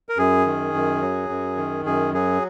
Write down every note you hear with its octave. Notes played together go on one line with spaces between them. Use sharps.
A#4
F#2 G#4
D#3
F#2
F#3
F#2
D#3
F#2 G#4
F#3 G#4